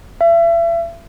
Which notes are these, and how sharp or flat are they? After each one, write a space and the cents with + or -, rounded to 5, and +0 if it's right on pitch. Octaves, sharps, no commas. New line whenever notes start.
E5 +40